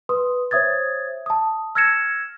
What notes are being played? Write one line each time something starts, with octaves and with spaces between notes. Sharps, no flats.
B4 C6 D#6
C5 C#5 E5 D#6 G#6 A6
A5 D#6
E6 F6 G#6 A#6 C#7 E7